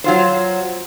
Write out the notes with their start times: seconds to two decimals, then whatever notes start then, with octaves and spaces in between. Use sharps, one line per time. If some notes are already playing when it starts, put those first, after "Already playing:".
0.04 F#3 F4 C5